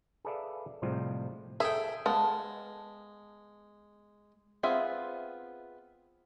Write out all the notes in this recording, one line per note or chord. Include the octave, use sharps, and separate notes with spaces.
G#4 A4 B4 D5 E5 F5
A2 C3 F3 G3 G#3 F4
G#4 A4 E5 G5
G#3 B3 F5 A5
B3 C4 F4 G#4 E5